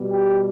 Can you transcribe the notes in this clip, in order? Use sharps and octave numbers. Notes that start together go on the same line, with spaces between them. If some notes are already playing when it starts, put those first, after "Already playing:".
Already playing: B2 G3 B3
G4